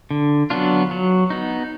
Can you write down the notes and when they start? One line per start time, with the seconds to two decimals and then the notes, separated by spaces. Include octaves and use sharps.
0.11 D3
0.50 F#3 B3 D4 F4
0.91 F#3
1.30 B3 D#4